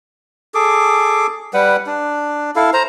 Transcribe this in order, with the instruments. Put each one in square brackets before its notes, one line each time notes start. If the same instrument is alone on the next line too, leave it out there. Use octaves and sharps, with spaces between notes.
[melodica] G#4 A4 D6
G3 B4 F#5
D4
E4 A4 F5
C5 A#5